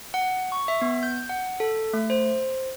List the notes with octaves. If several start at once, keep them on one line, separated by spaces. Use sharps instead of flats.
F#5
C#6
E5
B3
G6
F#5
A4
A3
C5